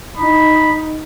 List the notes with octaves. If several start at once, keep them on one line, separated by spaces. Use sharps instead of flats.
D#4 B5